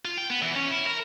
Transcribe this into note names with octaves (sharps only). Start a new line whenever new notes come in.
F4
G5
B3
E2
C#4
E4
A#4